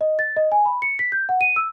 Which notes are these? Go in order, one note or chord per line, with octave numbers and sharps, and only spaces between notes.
D#5
A6
D#5
G#5
B5
C#7
B6
G6
F#5
D#7
E6